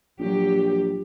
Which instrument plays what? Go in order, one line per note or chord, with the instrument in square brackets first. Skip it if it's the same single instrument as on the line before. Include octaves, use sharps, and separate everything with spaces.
[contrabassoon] A#1 [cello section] F#3 G4